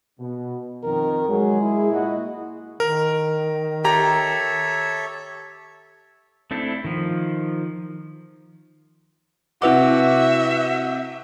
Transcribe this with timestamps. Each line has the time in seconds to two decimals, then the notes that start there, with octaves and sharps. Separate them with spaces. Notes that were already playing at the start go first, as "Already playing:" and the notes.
0.19 B2
0.84 F2 D#3 A#4
1.29 F#3 G#3 G#4
1.61 E4
1.91 A#2 F#4 D#5
2.80 D#3 A#4
3.84 G4 A4 C#5 E5 A#5
6.51 A3 C4 D4 E4 A4
6.84 D#3 F3
9.62 C3 E4 F#4 B4 E5 F#5 D6